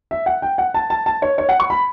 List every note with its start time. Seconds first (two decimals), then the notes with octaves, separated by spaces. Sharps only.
0.11 E5
0.26 F#5
0.42 G5
0.58 F#5
0.74 A5
0.90 A5
1.06 A5
1.22 C#5
1.38 C#5
1.49 F#5
1.60 C#6
1.70 B5